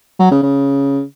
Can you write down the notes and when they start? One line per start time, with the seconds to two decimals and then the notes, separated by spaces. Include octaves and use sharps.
0.20 F#3
0.31 C#3
0.43 C#3